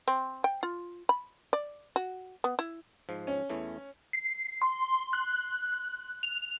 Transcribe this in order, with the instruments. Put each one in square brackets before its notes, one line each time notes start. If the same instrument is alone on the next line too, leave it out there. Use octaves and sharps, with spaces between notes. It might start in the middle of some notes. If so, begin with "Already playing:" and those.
[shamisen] C4
G5
F4
B5
D5
F#4
B3
E4
[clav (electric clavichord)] G#2 F3
[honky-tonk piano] C#4
[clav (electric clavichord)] E2 E3 A3
[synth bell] C7
C6
F#6
F7